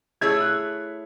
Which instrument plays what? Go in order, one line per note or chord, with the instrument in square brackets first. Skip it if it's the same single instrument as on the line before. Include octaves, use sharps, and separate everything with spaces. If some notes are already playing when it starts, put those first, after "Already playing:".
[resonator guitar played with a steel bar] A3 E4 G#4 C#5 [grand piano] G#6
[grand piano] F#6